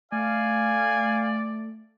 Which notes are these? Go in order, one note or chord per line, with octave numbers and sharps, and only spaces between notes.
A3 D5 F5 G#5